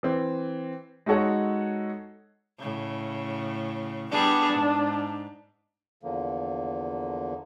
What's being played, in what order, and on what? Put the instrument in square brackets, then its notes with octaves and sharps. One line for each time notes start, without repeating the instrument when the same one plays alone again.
[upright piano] E3 C4
G#3 D#4 F#4 A4 C#5 F#5
[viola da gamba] A2 C#3
[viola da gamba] G3 B3 G#4 [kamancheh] D4
[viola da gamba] G#2
[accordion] E2 D3 F3 A#3